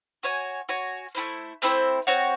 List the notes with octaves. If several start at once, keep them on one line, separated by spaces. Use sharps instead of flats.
F#4 C#5 G#5
F#4 C#5 G#5
A3 C4 E4 C5
A3 C4 E4 C5
C4 F#4 C#5 F#5